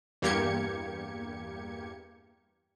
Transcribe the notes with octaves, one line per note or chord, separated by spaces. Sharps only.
E2 G2 A#3 G4 G#6 C#7